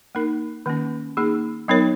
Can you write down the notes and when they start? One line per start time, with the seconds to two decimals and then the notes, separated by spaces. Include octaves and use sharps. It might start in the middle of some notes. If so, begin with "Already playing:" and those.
0.15 A#3 D#4 A#4
0.66 D#3 A#3 C#4
1.17 A#3 D#4 G#4
1.68 F#3 B3 D#4 A#4 C#5